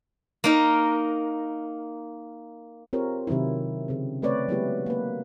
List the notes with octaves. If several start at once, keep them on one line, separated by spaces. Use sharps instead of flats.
A#3 D#4 A#4
C4 F4 G4 G#4 A#4 C#5
C3 D#3 F#3 C4 E4
C#3 C4
A3 C4 B4 C#5 D5
F#3 G#3 B3 E4 G4 B4
A#3 B4